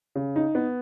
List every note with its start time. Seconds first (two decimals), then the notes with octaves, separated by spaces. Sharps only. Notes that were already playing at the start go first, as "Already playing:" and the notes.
0.15 C#3
0.36 D#4
0.55 B3